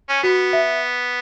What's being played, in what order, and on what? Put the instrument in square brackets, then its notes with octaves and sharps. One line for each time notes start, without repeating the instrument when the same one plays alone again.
[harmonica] C#4
[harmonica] B3 [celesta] F#4
[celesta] E5